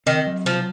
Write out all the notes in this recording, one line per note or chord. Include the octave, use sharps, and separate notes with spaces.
D#3 C4
F#3
C3 F3